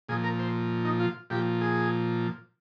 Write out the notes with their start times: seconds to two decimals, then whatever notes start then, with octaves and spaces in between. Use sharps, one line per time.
0.09 A#2 F3 G#4
0.24 A#4
0.39 C5
0.85 D#4
1.00 F4
1.30 A#2 F3 G4
1.61 G#4